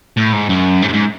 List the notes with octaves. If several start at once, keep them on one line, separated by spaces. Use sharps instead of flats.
A2
G#2
F#2
G#2
F#2
G#2